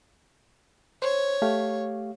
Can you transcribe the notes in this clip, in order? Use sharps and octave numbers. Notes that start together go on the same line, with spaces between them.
C5 C#5
A3 G4 F5